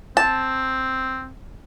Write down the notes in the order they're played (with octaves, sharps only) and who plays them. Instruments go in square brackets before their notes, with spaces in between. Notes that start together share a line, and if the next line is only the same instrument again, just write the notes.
[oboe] C4 [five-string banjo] A5